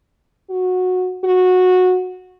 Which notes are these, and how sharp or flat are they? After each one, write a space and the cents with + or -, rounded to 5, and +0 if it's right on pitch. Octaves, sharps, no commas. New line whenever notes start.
F#4 -15
F#4 -15